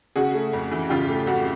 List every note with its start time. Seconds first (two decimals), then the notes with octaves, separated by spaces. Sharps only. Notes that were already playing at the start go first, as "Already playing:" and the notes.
0.16 C#3 F#4 G#4
0.34 A3
0.53 F2
0.71 E3
0.90 C#3 F4 G4
1.09 A3
1.27 F2 F#4